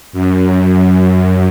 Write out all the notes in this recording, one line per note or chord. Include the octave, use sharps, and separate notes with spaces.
F#2